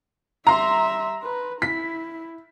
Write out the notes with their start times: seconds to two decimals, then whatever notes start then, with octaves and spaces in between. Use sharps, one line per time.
0.47 G3 E5 A#5 C6
1.22 B4
1.62 E4 B6